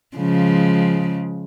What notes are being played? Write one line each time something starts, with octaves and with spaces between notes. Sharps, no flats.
C#3 F3 G#3